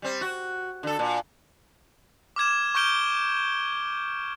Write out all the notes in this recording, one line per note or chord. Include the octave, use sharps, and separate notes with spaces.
G3 C4
F#4
D3 A4
A#2
D6 F6 G#6 E7
C#6 F6 G6 D7 G7